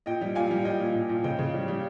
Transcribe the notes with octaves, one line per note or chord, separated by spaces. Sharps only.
A#2 D#5 G5
G3
A#2 F5 G#5
G3
A#2 D#5 G5
A#2
A#2
A#2
C#3 D#5 G5
C#3
G3
G3